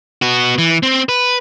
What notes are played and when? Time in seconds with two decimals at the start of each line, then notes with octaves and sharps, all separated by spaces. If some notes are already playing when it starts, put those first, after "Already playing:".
0.22 B3 F#4
0.58 E3
0.83 C4
1.09 B4